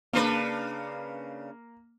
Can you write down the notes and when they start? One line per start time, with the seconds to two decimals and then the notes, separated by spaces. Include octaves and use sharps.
0.13 C#3 A#3 D4 B4